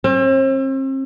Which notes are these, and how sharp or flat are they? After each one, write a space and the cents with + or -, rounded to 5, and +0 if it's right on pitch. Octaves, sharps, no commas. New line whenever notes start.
C4 +40